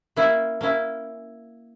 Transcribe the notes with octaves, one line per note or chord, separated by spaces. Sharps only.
A#3 C#4 E4
A#3 C#4 E4